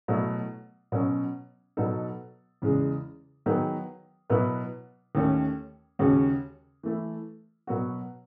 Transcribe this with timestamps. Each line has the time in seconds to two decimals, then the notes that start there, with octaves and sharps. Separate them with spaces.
0.08 B2 F#3 A3 E4
0.92 B2 F#3 C#4
1.77 B2 F#3 B3 D#4 A4
2.62 E2 C#3 G#3
3.46 D#3 F#3 B3 D#4 G#4
4.30 B2 F#3 B3 E4 B4
5.15 D#2 D#3 A3 C#4
5.99 D#2 C#3 G#3 C#4 F#4
6.83 E3 A3 E4
7.67 B2 F#3 B3 F#4